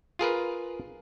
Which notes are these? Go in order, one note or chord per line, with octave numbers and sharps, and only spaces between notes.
F4 G#4 A#4 B4